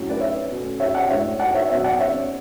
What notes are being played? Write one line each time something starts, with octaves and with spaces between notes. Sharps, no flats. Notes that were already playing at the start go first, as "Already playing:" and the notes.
Already playing: A2 F#3 C#4
B4 D5
C#5 E5
B2 A3 C#4
C#5 E5
D5 F#5
A2 G#3 D4 C#5 E5
D5 F#5
C#5 E5
B2 F#3 B3 C#5 E5
D5 F#5
C#5 E5